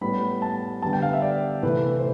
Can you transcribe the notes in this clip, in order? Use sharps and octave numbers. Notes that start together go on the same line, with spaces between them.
A2 G3 B3 B5
A5
D3 G3 B3 A5
G5
F5
E5
D5
C3 E3 A3 B4
C5